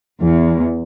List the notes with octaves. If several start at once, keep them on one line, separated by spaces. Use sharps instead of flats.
E2